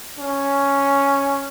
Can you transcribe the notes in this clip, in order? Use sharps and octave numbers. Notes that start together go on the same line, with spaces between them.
C#4